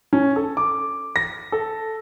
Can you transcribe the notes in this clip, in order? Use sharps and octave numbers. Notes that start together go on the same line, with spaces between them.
C#4
A4
D6
A#6
A4